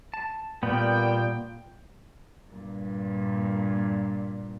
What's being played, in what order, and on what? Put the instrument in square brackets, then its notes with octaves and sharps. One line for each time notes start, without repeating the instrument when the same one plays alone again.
[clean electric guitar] A5
[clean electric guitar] A#2 [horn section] G3 F4 G5 [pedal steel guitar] A#3 B3
[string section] G2 A#2